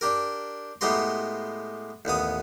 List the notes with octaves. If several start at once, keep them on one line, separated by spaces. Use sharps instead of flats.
D4 G4 A#4
A2 G#3 B3 G4 A#5 C6
A1 D#2 B3 D#6